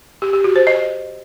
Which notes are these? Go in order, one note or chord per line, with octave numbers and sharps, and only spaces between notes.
G4
G4
F#4
C5
D#5